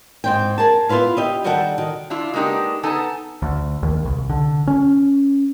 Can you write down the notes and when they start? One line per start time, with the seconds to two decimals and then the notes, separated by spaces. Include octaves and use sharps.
0.24 G#2 C4 G5
0.58 G#4 A#4 A5
0.89 B3 E4 F4 B4 F5
1.17 G4 D#5 E5
1.44 D#3 G3 F#4 A4 F#5 G5
1.78 D#3
2.10 D4 E4 F4
2.34 G#3 A#3 B3 D4 D#4 G4
2.83 B3 D#4 A4 G#5 A5
3.42 D2
3.83 D#2
4.05 C2
4.29 D3
4.67 C#4